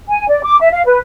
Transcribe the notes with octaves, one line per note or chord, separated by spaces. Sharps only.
G#5
D5
D6
E5
F5
B4